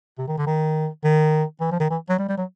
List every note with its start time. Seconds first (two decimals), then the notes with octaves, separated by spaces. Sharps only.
0.18 C3
0.28 D#3
0.38 D3
0.47 D#3
1.04 D#3
1.61 E3
1.71 F3
1.80 D#3
1.90 E3
2.09 F#3
2.19 G3
2.29 G3
2.37 F#3